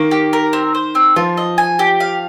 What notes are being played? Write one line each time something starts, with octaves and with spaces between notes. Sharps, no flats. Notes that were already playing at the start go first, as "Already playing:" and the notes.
Already playing: D#3 A#3
G4
A#4
C4
C5
C4
F3 F4
D#5
G#5
G4
F5